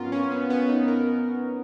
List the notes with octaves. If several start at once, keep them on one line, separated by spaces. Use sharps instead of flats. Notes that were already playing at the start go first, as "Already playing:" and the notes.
Already playing: G#2 F#3 B3 C#4 F4 A#4
C#4
B3
B3
D#4
A#4